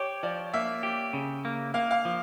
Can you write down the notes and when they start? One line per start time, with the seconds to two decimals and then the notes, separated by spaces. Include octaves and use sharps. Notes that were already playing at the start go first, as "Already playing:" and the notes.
Already playing: G4 C#5
0.23 F3 D5
0.53 A#3 E5
0.83 G4
1.13 C#3
1.45 A#3
1.74 A#3 F5
1.91 F5
2.05 F3